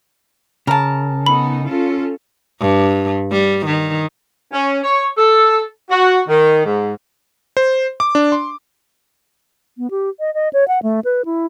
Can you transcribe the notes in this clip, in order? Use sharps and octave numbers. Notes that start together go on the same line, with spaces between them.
C#3 A#4 A5
B3 D#4 A4 B5
C#4 F4 A4
G2
G3
D#3
C#4
C#5
A4
F#4
D#3
G#2
C5
D6
D4
C6
B3
G4
D#5
D#5
C#5
F#5
A3
B4
E4